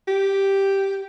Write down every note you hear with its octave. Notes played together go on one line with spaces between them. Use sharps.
G4